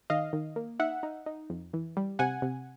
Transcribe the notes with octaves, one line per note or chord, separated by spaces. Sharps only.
D#3 D#5 F5
D#3
A#3
D#4 E5 F#5
D#4
D#4
F2
E3
G3
C3 F#5 G#5
C3